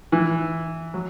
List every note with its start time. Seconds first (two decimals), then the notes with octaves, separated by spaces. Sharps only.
0.12 E3
0.94 F#3